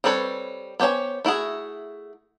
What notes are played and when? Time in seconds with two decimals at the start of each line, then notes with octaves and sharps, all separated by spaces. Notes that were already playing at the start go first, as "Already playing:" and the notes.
0.04 G3 C4 A4 B4 C#5
0.80 B3 G4 C5 C#5 G#5
1.25 A3 E4 F#4 G#4